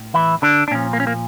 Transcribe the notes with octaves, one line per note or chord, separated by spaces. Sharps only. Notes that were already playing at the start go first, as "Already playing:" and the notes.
Already playing: A2
E3 E4
D3 D4
D4
A#2 F3 C#4
A#3
C#4
A#3